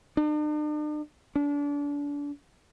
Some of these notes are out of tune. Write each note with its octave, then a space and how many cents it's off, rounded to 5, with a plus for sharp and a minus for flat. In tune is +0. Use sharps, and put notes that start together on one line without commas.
D4 +45
D4 -30